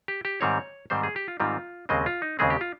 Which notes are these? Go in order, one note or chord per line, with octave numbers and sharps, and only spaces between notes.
G4
G4
G#2 D#3 G3 C4 C#5
G#2 D#3 G3 C4 C5
G#4
G4
F4
G#2 D#3 G3 C4 F4
D#2 C#3 G#3 C4 D#5
F4
D#4
D#2 C#3 G#3 C4 G#4
G4
F4